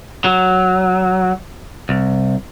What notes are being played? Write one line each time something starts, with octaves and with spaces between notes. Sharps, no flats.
F#3
C2